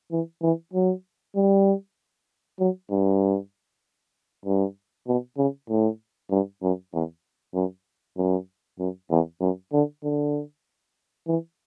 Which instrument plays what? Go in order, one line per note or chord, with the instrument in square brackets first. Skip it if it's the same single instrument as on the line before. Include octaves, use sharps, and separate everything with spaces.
[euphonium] E3
E3
F#3
G3
F#3
G2
G2
B2
C#3
A2
G2
F#2
E2
F#2
F#2
F#2
E2
F#2
D3
D3
E3